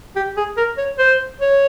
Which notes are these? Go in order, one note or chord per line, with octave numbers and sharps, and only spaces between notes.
G4
G#4
A#4
C#5
C5
C#5